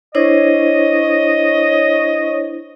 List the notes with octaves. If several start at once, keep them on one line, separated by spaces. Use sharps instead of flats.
D4 E4 C5 C#5 D#5